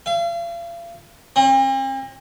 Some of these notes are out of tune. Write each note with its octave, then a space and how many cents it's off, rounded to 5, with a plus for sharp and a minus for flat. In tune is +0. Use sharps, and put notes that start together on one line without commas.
F5 -40
C4 +45